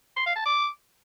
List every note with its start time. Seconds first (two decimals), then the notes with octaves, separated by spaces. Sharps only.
0.16 C6
0.26 F5
0.36 A5
0.45 D6